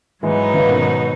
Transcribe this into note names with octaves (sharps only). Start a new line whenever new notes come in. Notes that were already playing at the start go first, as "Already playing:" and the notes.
G#2 E3 F#3 G#3 B3 D#4
C#3 E3
B2 D#3